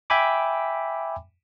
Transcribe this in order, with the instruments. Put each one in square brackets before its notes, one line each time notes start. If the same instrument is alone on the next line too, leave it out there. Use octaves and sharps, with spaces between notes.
[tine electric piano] E5 G5 G#5 B5 D6